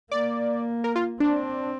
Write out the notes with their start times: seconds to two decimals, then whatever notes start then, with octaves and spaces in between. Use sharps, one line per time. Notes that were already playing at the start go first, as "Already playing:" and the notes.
0.11 A#3 D5
0.84 A#4
0.96 F4
1.20 C4 D4